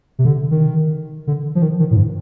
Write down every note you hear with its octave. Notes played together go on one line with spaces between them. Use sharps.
C3
D3
D#3
D3
F3
D#3
D#3
A2
G2